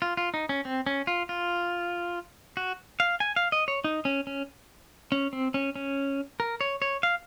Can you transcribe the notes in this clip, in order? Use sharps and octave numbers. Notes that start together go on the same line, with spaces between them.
F4
F4
D#4
C#4
C4
C#4
F4
F4
F#4
F5
G#5
F5
D#5
C#5
D#4
C#4
C#4
C#4
C4
C#4
C#4
A#4
C#5
C#5
F5